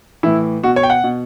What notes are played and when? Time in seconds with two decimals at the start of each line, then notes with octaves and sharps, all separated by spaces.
0.23 A2 E3 E4
0.63 B2 F#4
0.76 C#5
0.83 G5
0.90 F#5
1.04 B2